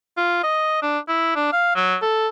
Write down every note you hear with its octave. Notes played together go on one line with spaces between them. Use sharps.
F4
D#5
D4
E4
D4
F5
F#3
A4